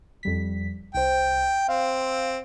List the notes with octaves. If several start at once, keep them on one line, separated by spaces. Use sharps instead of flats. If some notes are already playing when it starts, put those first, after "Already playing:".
F2 G3 B6
C2 C5 G5
C4 F5